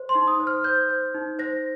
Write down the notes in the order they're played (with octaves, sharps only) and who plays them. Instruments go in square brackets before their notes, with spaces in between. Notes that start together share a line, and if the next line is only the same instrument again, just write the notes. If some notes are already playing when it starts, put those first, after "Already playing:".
Already playing: [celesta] C5
C6
D#4
D#6
C5
F6
C5 G6
C5
D#4
C5 A#6